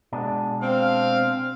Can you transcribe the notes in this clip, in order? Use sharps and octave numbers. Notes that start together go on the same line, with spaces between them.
B2 G#3 D4
C4 F5